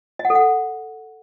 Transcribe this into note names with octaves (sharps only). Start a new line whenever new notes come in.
D#5
F#5
A4
F#5